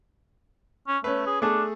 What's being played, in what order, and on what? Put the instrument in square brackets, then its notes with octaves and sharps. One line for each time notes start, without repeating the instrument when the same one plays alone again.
[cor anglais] C#4
[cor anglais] A3 [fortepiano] C#4 B4
[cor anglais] G#4
[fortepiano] A3 G#4 A4 [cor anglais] D4